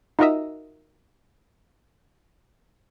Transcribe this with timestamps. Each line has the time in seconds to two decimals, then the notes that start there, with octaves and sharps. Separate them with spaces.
0.19 D#4 F4 F#4 A#4 D#5 E5